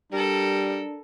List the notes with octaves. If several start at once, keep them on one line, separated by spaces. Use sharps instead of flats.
G3 D4 A4 A#4